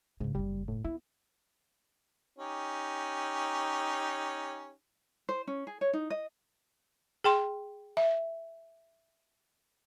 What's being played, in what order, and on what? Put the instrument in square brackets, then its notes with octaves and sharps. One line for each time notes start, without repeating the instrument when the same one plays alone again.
[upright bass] A1 C#3 [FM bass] G#2
[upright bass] F#1 E2 [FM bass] G3
[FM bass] A2
[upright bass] B3 [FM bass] E4
[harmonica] C#4 D#4 G4
[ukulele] C5
C#4
G#4
C#5
D#4
D#5
[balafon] G#4 G5 C6
E5